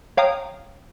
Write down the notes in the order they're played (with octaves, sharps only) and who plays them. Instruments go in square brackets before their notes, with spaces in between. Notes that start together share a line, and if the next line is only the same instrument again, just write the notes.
[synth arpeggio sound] C#5 F5 G5 A#5 D#6